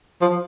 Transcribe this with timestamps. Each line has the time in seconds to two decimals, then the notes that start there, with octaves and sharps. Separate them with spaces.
0.22 F3